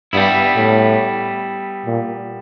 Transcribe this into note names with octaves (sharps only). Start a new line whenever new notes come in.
G2 G3 B3 E4
A2
A#2